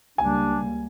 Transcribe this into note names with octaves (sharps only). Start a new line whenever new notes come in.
C#2 G3 A#3 D4 G#5